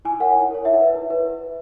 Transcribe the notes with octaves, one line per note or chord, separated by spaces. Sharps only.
E4 G#5
A#4 C#5 F#5
E4
A#4 C#5
E4 E5
B4
E4
B4